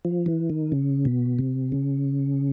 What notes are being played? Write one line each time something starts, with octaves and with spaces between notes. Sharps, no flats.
F3
E3
D#3
C#3
B2
C3
C#3